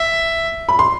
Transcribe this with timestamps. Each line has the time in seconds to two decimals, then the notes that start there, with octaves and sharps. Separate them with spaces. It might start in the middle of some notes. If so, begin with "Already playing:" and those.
Already playing: E5
0.69 B5
0.79 C6